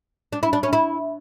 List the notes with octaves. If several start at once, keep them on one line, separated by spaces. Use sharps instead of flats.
D4
E4
D4
C#4
E4